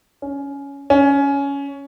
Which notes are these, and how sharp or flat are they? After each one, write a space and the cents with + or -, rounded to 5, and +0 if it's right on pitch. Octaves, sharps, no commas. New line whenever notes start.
C#4 +15
C#4 +15